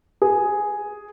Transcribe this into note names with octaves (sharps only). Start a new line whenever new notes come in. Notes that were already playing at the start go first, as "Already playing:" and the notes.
G#4